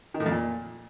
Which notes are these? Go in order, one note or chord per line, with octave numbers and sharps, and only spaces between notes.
D#3
A2
F2
A#2